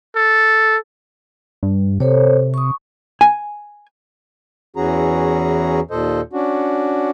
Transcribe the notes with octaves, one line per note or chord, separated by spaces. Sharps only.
A4
G2
C3 A4 C5 C#5
C#6 D#6
G#5
E2 E3 C#4 F#4 G#4 A#5
D#2 A#2 A4 C5 D#5
C#4 D4 F#4